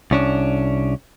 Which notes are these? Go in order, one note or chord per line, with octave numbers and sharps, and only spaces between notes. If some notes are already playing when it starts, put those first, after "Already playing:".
C2 C#4 D4